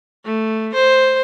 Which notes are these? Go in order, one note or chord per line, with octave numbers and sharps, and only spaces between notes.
A3
C5